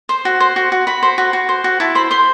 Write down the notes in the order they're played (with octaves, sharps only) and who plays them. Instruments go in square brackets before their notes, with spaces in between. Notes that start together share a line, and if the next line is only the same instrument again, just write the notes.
[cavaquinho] C5
F#4
C5
F#4
F#4
F#4 B5
C5
F#4
F#4
C5
F#4
E4 A5
C5 B5
C5 C6